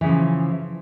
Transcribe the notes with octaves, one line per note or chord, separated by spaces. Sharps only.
C#3 E3 F3 C#4